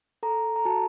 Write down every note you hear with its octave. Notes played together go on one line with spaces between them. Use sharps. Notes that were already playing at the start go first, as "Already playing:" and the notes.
A4 A#5
A#5
F#4 A5